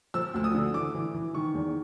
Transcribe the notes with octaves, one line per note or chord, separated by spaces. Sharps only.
F3 E6
D2 E6
D#6
D3
E3 D6
E3
E3
D#3 C#6
E2